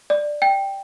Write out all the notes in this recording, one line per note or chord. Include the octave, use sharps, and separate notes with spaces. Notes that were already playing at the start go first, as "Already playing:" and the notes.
D5
G5